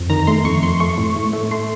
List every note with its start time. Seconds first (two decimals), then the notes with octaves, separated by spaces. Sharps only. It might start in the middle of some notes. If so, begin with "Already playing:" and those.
Already playing: F2
0.10 D#3 A#5
0.27 A3 C6
0.45 F2 C#6
0.63 F2 C6
0.80 A3 C#6
0.98 A2
1.16 A2
1.33 A3
1.51 A3 C6